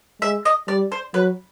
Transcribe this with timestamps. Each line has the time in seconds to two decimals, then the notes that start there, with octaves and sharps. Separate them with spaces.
0.22 G#3 E5
0.45 D#5
0.68 G3 D5
0.92 C5
1.14 F#3 B4